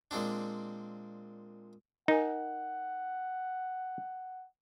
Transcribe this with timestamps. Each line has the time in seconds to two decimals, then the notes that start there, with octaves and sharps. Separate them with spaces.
0.11 A#2 G#3 C4 D4
2.08 D#4 A#4 F#5 G#5